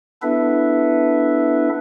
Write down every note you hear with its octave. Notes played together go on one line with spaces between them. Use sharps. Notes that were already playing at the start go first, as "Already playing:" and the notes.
B3 D4 E4 A4 B4 E5